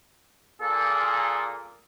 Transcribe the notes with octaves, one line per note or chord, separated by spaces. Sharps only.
A#2 A#3 G#4 A4